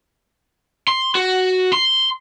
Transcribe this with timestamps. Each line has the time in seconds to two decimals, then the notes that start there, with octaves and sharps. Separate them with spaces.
0.88 C6
1.15 F#4
1.73 C6